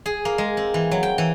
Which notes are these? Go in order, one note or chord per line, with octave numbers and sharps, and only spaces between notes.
G#4
A#3
G#3
C4
E3
F#3
G5
E3